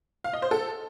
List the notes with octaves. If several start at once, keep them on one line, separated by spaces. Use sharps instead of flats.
F5
D#5
C5
A4